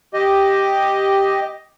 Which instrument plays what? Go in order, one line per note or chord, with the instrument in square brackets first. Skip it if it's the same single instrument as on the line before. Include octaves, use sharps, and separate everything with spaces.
[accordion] G4 D#5